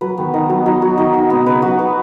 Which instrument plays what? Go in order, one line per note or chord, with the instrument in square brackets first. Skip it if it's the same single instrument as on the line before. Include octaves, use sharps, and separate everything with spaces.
[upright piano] F#3 [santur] B4
[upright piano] D#3 [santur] B3
[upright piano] D#3 [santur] D#4
[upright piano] F#3 [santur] B3
[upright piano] F#3 [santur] D#4
[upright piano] F#3 [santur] F#4
[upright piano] D#3 [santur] D#4
[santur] F#4
[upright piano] B2 [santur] B3
[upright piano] C#3 [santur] B4
[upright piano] F#3 [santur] F#4
[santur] B4